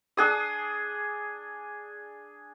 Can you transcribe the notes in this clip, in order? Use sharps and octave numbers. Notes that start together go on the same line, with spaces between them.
D4 G#4 D#6